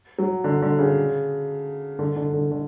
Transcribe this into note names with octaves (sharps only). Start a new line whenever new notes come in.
F#3
D3
D3
C#3
D3
D3
D3
D3